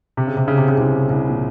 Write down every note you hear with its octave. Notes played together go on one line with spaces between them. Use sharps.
C3
C#3
C3
C#3
C3
C#3
C2 C3
C2 C3
A#2